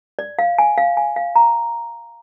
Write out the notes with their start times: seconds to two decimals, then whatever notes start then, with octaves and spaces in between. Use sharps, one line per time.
0.19 D5
0.39 F5
0.58 G#5
0.78 F5
0.97 G#5
1.16 F5
1.35 A#5